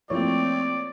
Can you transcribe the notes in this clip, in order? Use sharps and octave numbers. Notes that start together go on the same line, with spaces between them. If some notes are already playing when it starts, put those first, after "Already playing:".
F3 A3 A#3 C4 E4 C#5 D5